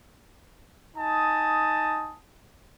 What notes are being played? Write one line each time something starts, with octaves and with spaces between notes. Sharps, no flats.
D#4 G#5 A5 D#6